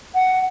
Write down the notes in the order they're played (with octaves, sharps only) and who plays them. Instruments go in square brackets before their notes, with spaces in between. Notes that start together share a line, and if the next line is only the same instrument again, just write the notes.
[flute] F#5